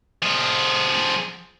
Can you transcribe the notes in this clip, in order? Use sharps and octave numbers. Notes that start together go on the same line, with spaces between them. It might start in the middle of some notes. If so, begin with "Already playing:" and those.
F3 G#4